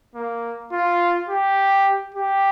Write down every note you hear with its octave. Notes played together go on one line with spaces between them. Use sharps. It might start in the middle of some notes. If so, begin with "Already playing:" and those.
A#3
F4
G4
G4